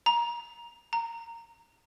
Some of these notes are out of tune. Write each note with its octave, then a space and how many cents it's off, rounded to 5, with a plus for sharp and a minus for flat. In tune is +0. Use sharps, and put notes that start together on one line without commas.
A#5 +25
A#5 -15